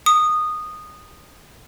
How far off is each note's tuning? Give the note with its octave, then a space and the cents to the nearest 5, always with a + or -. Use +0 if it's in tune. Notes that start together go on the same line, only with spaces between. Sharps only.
D#6 -15